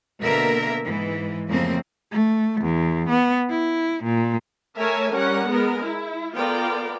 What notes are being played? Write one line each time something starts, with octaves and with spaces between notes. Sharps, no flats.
B2 D3 A#3 A#4 E5
G#2 E3
F2 C#3 A3 A#3 C4
A3
E2
B3
E4
A#2
A3 A#4 C#5 E5 G#5 A5
G3 C#4 A#4 F#5
G#3 B3 A#4
E4
B3 F4 A4 A#4 D5 G5